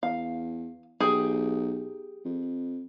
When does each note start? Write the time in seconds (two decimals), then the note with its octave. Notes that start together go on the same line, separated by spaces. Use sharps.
0.03 E2 F5
1.00 B1 G4 G#4
2.25 F2